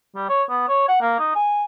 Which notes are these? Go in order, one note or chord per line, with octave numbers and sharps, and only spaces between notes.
G3
C#5
B3
C#5
F#5
A#3
D#4
G#5